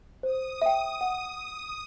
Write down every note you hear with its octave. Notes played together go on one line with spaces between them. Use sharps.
C5 D#6
E5 G5
F#5